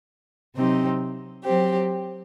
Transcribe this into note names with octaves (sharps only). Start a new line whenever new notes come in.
C3 F#3 C4 D#4 G4
F#3 C4 G4